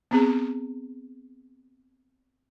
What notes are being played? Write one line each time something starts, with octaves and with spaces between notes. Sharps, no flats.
B3 C4 G#4